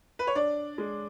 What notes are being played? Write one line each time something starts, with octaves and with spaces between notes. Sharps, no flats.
B4
C#5
D4 D5
G#3